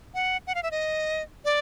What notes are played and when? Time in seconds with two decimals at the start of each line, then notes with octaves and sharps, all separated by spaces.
0.14 F#5
0.47 F#5
0.55 F5
0.63 E5
0.71 D#5
1.45 D5